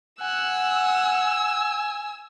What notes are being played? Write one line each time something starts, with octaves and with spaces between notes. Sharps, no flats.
F#5 G#5 E6